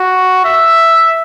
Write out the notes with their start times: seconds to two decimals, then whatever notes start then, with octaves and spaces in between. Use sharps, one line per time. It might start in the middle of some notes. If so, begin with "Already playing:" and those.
Already playing: F#4
0.45 E5